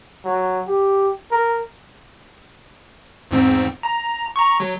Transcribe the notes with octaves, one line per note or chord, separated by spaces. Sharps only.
F#3
G4
A#4
E2 G#2 C4
A#5
A#5 C#6
F#3